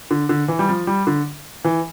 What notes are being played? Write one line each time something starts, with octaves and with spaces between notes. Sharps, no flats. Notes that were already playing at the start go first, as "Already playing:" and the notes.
D3
D3
E3
G3
F3
G3
D3
E3